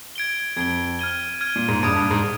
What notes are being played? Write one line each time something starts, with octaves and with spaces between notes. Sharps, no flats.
G#6 D7 G7
F2 G#6 D7 G7
F6 G#6 D#7 G7
F6 G#6 D#7 G7
A#2
G#2
G2 D#6 G#6 D7
G2
G#2